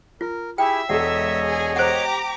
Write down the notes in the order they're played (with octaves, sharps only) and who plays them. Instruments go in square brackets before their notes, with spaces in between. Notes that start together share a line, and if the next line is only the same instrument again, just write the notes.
[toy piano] F4 [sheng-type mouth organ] A#4
[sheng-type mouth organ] E4 G4 G#4 [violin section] E5 [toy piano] G5
[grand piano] E1 G#3 A4 [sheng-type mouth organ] C#5 D#5 [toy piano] F#5
[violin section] G#4
[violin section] G4 A#5 D6 [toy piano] C5 F#5